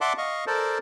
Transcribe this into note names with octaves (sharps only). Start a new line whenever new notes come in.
D5 E5 F#5 A5 C6 D6
D#5 F5 C#6
A4 A#4 C5 D5 A5